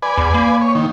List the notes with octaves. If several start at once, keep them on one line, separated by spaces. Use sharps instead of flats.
B4 D5 G#5
E2
A#3
C#5
D#3